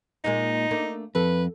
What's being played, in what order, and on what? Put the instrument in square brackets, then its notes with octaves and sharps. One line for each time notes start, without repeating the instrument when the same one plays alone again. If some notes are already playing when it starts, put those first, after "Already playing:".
[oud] A#2 G#3 A#3 [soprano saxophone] D#4
[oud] A3 A#3 D4
[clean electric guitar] F2 [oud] A4 [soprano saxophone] B4